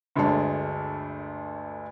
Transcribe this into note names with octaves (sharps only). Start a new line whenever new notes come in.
G1 D2 G#3 C#5 A5